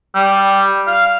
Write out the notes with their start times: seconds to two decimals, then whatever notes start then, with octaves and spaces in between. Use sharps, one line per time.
0.15 G3
0.87 F5